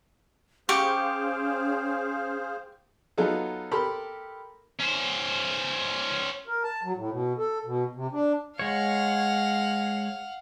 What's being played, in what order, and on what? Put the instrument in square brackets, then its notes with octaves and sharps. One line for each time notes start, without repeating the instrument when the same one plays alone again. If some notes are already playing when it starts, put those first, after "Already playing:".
[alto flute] C#4 [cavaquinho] G4 C#6 [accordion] G#4 C5 F5
[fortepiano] F#3 B3 D#4 F4 G#4 A4
G4 A4 A#4 B5 C6
[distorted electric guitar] C#4 C5
[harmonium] A#4
A5
F#3
A2
B2
A4
B2
C3
D4
[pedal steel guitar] G#3 C#5 [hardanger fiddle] F5 F#5